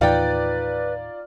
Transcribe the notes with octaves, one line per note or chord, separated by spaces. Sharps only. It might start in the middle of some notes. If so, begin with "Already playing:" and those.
D#2 A2 E3 D#4 F4 B4 D5 G5